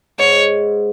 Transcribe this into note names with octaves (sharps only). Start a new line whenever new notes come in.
G#2 C#5